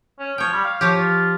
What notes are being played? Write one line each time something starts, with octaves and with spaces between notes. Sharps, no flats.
C#4
F3 C#5 G5
G3
F5
F3 G4 C#5
F4